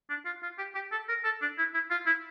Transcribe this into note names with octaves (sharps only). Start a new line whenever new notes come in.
D4
F4
F4
G4
G4
A4
A#4
A4
D4
E4
E4
F4
E4